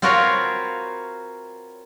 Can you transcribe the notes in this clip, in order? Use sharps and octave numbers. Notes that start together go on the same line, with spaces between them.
C4 F4 F#4 A#4 B4 C#5